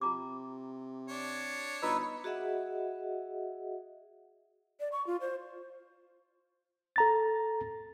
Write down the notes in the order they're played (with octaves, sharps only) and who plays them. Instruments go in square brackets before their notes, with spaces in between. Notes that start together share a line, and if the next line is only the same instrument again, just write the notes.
[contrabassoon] C3 [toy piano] F4 A#5 D6
[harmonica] D4 C#5
[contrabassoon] G1 [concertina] D#4 B4 E6 [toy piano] F4
[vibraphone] F#4 G#4 D#5 E5 F#5
[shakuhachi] D5
C#6
F4
C5
[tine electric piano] A4 A#5 A6